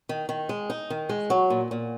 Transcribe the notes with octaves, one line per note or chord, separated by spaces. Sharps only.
D#3
D#3
G#3
D#4
D#3
G#3
F#3
A#2
A#2